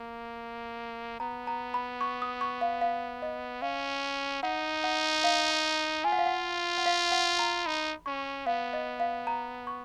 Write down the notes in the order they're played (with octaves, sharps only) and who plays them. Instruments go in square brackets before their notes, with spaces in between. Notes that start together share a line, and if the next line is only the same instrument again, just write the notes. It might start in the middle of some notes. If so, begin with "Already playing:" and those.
Already playing: [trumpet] A#3
[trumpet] B3 [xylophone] A#5
[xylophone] A#5
B5
C#6
D#6
C#6
F5
F5
D#5
[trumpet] C#4 [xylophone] F5
[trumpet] D#4 [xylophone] F#5
[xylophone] F#5
F5
A#5
[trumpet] F4 [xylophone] G#5
[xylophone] F#5
F5
F#5
F#5
F5
F#5
A#5
[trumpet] D#4 [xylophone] B5
[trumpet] C#4 [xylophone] C#6
[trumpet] B3 [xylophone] F5
[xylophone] D#5
F5
A#5
C#6